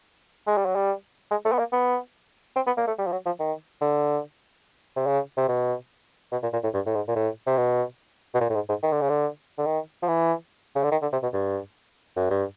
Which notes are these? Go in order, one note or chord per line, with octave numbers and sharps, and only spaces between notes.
G#3
G3
F#3
G3
G#3
A3
B3
A#3
B3
C4
B3
A#3
A3
G3
F3
F#3
F3
D#3
D3
C3
C#3
C3
B2
B2
A#2
A#2
A2
G2
A2
G#2
A#2
A2
C3
B2
B2
A#2
A2
G#2
G#2
D#3
D3
C#3
D3
D3
D#3
F3
E3
C#3
D3
D#3
D3
C3
B2
G2
F#2
G2